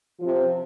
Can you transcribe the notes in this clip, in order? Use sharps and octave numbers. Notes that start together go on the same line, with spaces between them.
C3 F3